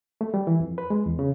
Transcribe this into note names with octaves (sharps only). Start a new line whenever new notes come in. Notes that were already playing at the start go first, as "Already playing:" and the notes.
A3
G3
E3
F2
B4
G#3
E2
C#3